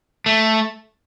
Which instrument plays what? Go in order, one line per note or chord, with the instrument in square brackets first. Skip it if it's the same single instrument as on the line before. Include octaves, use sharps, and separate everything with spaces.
[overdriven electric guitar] A3